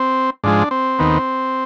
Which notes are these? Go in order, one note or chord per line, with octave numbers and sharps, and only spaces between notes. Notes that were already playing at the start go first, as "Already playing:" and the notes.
Already playing: C4
G#2 F3 G#3 D4
C4
D#2 D#3 B3